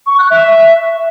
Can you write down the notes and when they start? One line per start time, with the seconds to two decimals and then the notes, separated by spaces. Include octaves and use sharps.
0.06 C#6
0.18 F#6
0.30 E5